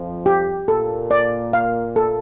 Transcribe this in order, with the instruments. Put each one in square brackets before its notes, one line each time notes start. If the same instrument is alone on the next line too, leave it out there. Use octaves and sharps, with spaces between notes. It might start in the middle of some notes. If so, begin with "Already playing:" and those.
Already playing: [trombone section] F2 F3
[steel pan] G4
[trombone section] A#2 A#3 [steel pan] A4
[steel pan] D5
F5
A4